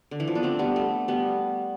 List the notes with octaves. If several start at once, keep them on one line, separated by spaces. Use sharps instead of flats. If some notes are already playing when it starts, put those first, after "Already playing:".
D3
E3
F3
B3 D4
A3 C4
G3 B3
A3
G3 B3